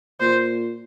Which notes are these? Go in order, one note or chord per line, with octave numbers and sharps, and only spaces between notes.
A#2 C5